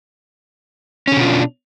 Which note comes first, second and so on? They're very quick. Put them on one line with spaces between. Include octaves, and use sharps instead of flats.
C#4 D3 B2 F4 D4